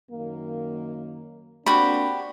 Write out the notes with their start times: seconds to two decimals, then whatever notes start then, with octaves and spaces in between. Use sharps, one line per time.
0.11 F#2 D#3 A#3
1.66 A#3 C4 D4 F#4 G4 B5